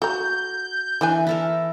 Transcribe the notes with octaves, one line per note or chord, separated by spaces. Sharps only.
F#4 A4 A#5 G6
E3 B3 D4 G#5
E4 A4 A#4